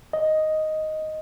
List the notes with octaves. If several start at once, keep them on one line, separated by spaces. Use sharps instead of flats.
D#5